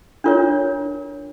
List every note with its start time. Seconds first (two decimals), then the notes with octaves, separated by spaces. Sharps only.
0.24 D4 F4 A#4 C#5